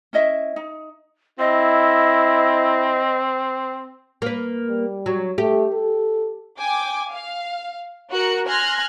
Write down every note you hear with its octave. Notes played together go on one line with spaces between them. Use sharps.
C#4 E4 D#5 E5
D#4
C4 E4 D#5
A#3 B4
G3
F#3
A3 G4
A4
G5 G#5 D6
F5
F#4 A#4 F#6 C#7
G#5 C6 F6 F#6 G#6 A#6